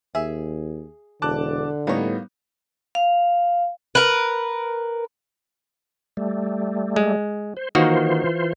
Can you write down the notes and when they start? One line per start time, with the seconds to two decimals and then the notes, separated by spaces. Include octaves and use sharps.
0.15 D#2 G#4 E5
1.22 E1 D3 A5 D6 F#6
1.87 A2 G3 A#3 B3 D#4 C#5
2.95 F5
3.95 A#4 B4
6.17 G3 A3
6.96 G#3
7.57 C5
7.75 D#3 E3 A#3 F4 F#4 C5